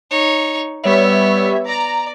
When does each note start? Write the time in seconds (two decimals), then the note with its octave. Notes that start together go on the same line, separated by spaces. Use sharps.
0.10 D#4 C#5
0.83 G3 B3 C#5 E5
1.65 D5 A#5